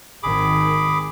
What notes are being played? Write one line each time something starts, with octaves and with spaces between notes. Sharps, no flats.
G#1 D#3 G#4 B5 D6